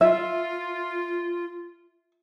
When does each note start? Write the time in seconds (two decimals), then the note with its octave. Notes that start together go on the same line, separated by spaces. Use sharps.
0.01 F4 E5